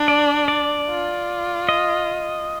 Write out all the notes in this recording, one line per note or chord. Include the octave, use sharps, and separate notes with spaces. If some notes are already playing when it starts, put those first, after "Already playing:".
Already playing: D4
D5
D5
F4
D#5